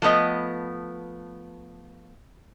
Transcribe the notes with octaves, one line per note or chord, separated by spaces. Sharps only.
F3 A3 B3 D#5